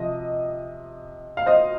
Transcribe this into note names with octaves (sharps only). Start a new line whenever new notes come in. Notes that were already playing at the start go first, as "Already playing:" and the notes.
Already playing: C3 F3 D#5
F5
C5 D#5